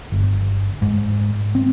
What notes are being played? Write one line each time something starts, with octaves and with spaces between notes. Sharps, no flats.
G1
G#2
C4